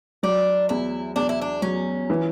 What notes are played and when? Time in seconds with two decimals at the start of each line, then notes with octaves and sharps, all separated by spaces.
0.23 F#3 D4
0.69 E2 E4
1.16 E2 D4
1.29 E4
1.41 D4
1.62 F#3 C#4
2.10 E3